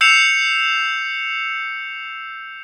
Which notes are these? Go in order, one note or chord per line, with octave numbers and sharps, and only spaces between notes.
E6 G6 C7 C#7 E7 F7